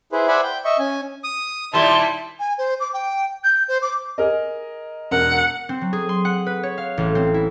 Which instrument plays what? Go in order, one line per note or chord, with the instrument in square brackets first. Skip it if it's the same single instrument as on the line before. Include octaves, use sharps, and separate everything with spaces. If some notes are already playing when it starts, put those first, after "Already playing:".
[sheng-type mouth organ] E4 G#4 B4 C5
C5 D5 E5 F#5 G#5 B5
G5
D#5 E5 C#6
C#4 G#5
D#6
[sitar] D#2 A#2 G3 [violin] E4 [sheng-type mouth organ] A5 [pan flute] C6
[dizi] G#5
C5
D6
G5
G6
C5
D6
[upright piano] G#4 A#4 D#5
[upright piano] E1 A#4 [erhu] F#5
[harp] C4
F#3
G#4
C6
F#5
B4
C#5
F5
A1
C4
E4